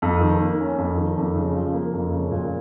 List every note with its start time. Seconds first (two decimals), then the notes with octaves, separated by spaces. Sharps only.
0.02 F2
0.21 D#3
0.40 A#3
0.60 C#4
0.78 F2
0.98 D#3
1.17 F2
1.36 C#3
1.55 F3
1.74 A#3
1.93 F2
2.13 C#3
2.31 A#2